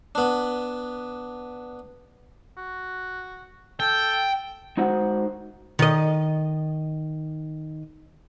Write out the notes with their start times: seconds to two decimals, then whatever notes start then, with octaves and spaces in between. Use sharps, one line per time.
0.15 B3 D4
2.57 F#4
3.80 A4 G5
4.77 G#3 D#4 F#4 C5 F#5
5.79 D#3 D#5